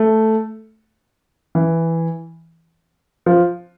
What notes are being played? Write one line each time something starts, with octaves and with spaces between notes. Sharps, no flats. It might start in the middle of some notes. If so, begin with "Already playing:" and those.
Already playing: A3
E3
F3